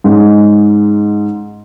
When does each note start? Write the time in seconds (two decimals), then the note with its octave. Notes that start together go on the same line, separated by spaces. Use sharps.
0.04 G#2 G#3 C#4